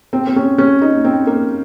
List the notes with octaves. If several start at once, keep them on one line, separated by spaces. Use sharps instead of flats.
C4
C4
C#4
C#4
D#4
C4
A#3